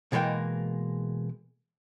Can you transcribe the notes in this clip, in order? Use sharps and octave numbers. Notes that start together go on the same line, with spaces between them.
B2 E3 G#3 A#3 G5